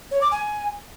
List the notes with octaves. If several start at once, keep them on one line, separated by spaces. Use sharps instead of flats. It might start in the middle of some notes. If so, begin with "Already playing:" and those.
C#5
D6
G#5